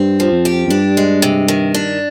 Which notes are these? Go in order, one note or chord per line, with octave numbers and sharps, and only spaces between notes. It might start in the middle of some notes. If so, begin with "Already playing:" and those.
Already playing: G2 C4
F3
F2
G4
F2
G2 D4
G#3
C3
D#3
D4